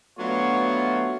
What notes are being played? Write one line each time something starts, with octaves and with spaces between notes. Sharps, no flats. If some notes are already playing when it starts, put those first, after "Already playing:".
F#3 A3 B3 D4 F4 C#5